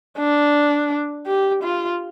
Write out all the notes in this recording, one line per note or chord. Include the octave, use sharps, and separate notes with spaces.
D4
G4
F4